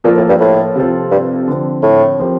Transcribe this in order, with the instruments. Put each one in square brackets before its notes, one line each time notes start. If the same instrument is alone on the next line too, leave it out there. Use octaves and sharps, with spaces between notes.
[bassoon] A#2 [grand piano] F3 A#3 F4 A4
[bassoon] A2
G2
A2
[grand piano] C3 F3 C4 F4 A4
[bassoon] G2
[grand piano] D3 F3 C4
[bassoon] A2
[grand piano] F3 C4 G4 A#4